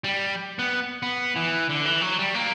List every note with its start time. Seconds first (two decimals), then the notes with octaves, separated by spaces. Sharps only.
0.04 G3
0.59 B3
1.03 B3
1.36 E3
1.69 D3
1.85 E3
2.01 F#3
2.18 G3
2.34 A#3